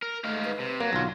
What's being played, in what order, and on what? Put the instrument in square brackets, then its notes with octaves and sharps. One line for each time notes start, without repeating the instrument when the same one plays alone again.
[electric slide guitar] A#4
[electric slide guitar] G#2 D#4 F5 [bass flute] A3
[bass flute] B4
[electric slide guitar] C3
[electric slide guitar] F#3 [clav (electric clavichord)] A#3
[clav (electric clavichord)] B1 F4 [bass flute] D3